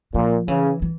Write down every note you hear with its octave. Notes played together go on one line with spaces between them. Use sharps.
A#2 F3
C#3 E3
E3